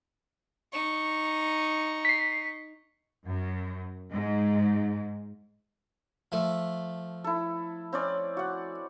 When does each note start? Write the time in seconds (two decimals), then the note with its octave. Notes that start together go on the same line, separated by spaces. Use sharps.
0.73 D#4 C#6
2.05 B6 C7
3.25 F#2
4.11 G#2
6.32 F3 A3
7.24 E4 A4
7.93 C4 C#4 D5
8.37 F#4 F#5